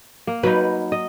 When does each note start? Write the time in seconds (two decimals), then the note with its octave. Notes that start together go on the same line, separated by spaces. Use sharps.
0.27 A#3
0.43 F#3 D#4 B4
0.92 D#5